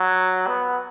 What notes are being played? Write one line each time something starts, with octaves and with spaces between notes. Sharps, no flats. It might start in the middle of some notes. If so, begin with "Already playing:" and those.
Already playing: F#3
B3